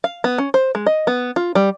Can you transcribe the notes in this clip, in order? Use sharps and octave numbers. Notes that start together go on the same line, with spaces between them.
F5
B3
C#4
C5
G#3
D#5
B3
F4
G3